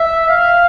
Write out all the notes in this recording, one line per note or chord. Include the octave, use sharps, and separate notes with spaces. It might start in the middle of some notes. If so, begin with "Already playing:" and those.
Already playing: E5
F5